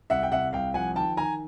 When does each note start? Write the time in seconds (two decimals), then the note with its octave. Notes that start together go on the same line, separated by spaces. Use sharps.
0.10 C2 E5 F#5
0.23 G5
0.31 C2 E5 F#5
0.53 C2 F5 G5
0.74 F3 F#5 G#5
0.96 D#3 G5 A5
1.17 D#3 G#5 A#5